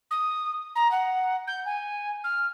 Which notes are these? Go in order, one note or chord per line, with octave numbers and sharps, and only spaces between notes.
D#6
A#5
F#5
G6
G#5
F6